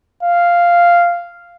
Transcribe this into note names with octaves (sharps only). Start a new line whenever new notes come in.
F5